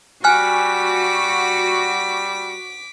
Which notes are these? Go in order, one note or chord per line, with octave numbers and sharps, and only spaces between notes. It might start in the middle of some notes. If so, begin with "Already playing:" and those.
G3 F#4 G#5 D6 F6 F#6 B6